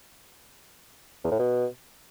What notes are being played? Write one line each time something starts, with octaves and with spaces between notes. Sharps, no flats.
E2
A2
B2